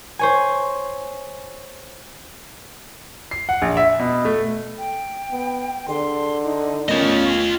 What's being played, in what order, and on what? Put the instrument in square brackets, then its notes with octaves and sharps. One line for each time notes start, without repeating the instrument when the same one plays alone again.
[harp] C5 C#5 G#5
[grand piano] C7
F#5
A#1
E5
B2
A3
[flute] G5
[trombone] B3
[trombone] D3 [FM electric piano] G#4 D5 [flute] C6
[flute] D#4
[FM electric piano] A3 B3 A#4 [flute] C#4 [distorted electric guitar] F4 D#5